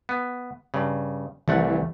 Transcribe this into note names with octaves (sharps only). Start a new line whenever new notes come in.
B3
G2 C#3
C2 E3 A3 F#5